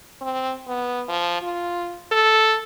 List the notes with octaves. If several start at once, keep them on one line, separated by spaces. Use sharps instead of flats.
C4
B3
F3
F4
A4